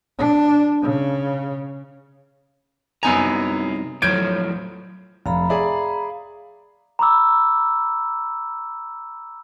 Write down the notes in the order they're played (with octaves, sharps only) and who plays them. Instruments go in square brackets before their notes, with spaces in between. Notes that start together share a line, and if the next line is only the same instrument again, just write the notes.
[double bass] D4
C#3
[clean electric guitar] C2 D#4 A#5 [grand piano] F#2 B3 G#5
[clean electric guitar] A2 F3 F#3 [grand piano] G6 G#6 D7
[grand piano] F1 [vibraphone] F5 A#5 B5
[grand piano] G#4 D5 E5
[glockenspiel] A#5 B5 D6 E6